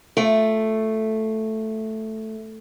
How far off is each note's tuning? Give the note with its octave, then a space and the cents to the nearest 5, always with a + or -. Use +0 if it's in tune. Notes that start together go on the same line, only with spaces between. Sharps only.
A3 +0 F4 +10